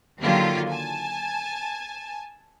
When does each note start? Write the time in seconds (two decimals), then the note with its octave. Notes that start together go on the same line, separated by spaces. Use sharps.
0.21 D3 D#3 F#3 A#3 F4 G4
0.69 G#5 A5